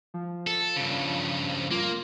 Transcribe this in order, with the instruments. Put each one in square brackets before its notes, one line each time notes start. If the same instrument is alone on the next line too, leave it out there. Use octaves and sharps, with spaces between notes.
[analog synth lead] F3
[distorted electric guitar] A4
G2 C#3
[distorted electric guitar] A#3 [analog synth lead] F4